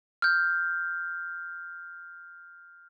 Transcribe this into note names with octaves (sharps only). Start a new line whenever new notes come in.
F6 G6